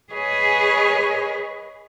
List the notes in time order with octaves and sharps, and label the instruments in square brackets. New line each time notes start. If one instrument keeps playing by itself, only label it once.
[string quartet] G#4 B4 C#5 D#5 G#5